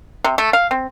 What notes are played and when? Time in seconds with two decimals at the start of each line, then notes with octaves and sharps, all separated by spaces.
0.24 C3
0.38 A3
0.53 F5
0.71 C4